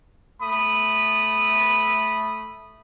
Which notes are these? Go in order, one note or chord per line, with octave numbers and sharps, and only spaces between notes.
A3 B5 D#6